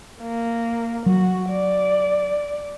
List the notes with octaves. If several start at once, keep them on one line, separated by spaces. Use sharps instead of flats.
A#3
F#3 F#4
D5